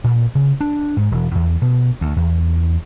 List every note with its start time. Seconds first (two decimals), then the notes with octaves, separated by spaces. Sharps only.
0.04 A#2
0.35 C#3
0.61 D4
0.97 G#2
1.11 E1
1.35 E2
1.62 B2
2.01 D2
2.16 E2